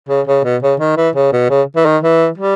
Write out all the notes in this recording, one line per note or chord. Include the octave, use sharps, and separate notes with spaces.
C#3
C#3
B2
C#3
D#3
E3
C#3
B2
C#3
E3
D#3
E3
G3